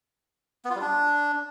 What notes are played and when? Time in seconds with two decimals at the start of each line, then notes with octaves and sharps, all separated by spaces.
0.65 B3
0.70 F4
0.76 G3
0.81 D4